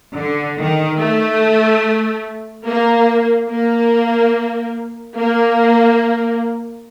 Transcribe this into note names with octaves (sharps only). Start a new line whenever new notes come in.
D3
D#3
A3
A#3
A#3
A#3